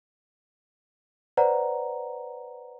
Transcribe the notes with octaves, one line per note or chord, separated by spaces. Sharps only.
B4 C5 D5 F#5 A#5